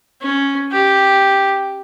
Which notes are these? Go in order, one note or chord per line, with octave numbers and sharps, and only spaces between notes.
C#4
G4